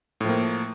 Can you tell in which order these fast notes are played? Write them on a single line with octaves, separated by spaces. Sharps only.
A2 F3 A#3